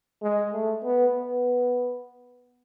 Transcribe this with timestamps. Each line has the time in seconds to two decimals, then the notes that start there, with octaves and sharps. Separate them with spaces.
0.22 G#3
0.53 A3
0.84 B3
1.15 B3